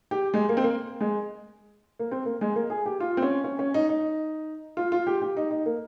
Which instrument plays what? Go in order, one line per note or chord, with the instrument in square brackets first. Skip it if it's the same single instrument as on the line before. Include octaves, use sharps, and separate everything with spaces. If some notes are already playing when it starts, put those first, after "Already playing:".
[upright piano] G4
G#3
A#3
C4
A#3
G#3
A#3
C4
A#3
G#3
A#3
G#4
G4
F4
C4
C#4
C#4
C#4
D#4
D#4
F4
F4
G4
G4
D#4
D#4
A#3